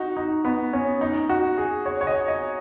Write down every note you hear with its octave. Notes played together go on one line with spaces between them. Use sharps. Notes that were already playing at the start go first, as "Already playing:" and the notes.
Already playing: D#4 F#4
D#4
B3
C#4
D#4
F#4
G#4
C#5
C#5
D#5
D#5